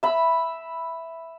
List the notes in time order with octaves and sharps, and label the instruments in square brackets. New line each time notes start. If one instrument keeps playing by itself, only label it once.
[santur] E5 B5